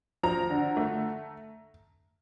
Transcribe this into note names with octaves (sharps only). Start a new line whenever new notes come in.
F3 A#5
D3
A3